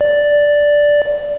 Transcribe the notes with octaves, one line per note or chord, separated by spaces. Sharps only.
D5